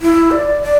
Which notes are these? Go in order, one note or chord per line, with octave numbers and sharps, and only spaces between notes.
E4
D5
D5